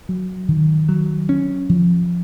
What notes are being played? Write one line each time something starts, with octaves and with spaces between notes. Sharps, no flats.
F#3
D#3
F#3
C#4
F3